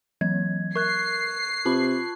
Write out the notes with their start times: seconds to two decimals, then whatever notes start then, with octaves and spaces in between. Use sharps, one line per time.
0.21 E3 F#3 G#6
0.76 A#4 C#6 F#6 G#6 C7
1.65 C3 F4 A5 B5